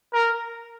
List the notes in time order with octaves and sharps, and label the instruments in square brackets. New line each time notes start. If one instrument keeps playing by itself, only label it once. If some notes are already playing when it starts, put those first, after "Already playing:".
[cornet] A#4